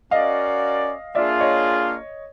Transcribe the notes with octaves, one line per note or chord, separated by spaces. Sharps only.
C#4 F#4 A#4 D5 D#5 F5
A#3 D4 F4 G#4 D5 E5
C#5 D#5